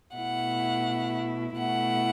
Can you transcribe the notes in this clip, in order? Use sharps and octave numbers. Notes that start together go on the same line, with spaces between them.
B2 A3 E4 F#5
B2 A3 E4 F#5